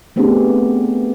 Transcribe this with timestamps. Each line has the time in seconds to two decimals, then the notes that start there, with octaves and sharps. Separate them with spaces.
0.16 A3 B3 C4 D4 G4 G#4